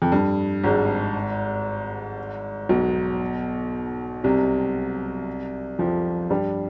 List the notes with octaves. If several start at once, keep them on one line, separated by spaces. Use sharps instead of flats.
F2
G2
G#1 G#2
B1 B2
C2 C3
F2 F3
G2 G3